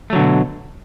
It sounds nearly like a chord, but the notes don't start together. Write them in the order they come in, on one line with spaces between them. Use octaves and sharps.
A3 F#3 D3 B2